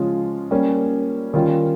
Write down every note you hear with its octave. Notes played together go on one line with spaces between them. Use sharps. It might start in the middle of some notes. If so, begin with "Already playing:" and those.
Already playing: C#3 F3 G#3 C#4 F4
G3 A#3 C#4
D#3 G3 C#4 F4